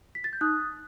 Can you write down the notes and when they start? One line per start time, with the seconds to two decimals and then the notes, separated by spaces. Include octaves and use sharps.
0.15 B6
0.24 A6
0.33 G6
0.41 D#4 D#6 F#6